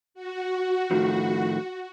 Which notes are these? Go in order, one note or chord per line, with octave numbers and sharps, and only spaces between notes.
F#4
A2 D#3 F3